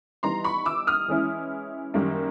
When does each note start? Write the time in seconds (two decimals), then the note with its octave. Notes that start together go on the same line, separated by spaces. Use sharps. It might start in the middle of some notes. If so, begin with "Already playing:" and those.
0.23 E3 G3 B3 D#4 A#5 C6
0.44 B5 C#6
0.66 D6 E6
0.87 D#6 F6
1.08 E3 G#3 C#4 E4
1.94 F#2 D#3 G3 A#3